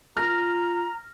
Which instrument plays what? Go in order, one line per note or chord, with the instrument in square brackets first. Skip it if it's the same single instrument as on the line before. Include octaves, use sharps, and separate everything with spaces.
[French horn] F4 [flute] A#5 [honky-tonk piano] F6 A#6